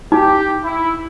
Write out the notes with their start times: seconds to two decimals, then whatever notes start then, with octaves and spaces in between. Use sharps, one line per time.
0.12 D#4 G4
0.63 E4